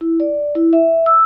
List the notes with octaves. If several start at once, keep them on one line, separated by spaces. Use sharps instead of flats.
E4
D5
E4
E5
E6